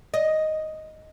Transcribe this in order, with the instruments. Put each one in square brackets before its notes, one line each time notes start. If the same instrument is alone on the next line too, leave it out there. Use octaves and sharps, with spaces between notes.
[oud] D#5